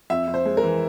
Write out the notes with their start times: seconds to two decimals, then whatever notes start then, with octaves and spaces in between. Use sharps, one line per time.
0.10 F2 E5
0.27 F2
0.34 C5
0.45 G#3
0.57 A#4
0.63 E3